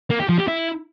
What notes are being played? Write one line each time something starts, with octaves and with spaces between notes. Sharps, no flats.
A#3
G4
F3
G4
E4